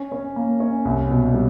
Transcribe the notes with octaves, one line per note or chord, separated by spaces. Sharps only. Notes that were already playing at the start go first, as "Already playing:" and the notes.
Already playing: C#4
C#4
A#3
C#4
C2
B2
G3